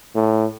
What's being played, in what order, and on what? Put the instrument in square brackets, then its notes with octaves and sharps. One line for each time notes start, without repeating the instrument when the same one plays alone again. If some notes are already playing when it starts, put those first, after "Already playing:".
[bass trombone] A2